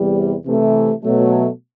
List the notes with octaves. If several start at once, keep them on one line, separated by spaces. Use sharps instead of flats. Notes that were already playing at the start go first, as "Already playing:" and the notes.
Already playing: E2 C3 G3
C3 E3 A3
B2 F#3 A3